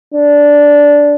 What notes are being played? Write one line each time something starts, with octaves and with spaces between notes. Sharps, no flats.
D4